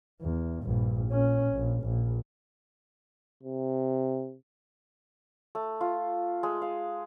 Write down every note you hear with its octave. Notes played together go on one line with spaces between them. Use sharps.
E2
A#1 G2
A#2 C#4
A#1
A#1
C3
A3
F4
G#3
F5